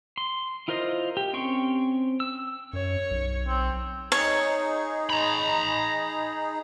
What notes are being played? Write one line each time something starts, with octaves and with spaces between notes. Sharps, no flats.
C6
E4 F4 A#4 C5 D#5
G4
C4 C#4 G5 C6 C#6
E6
F#2 C#5
B1
C4
D#4 G#4 C#5
A#5 B5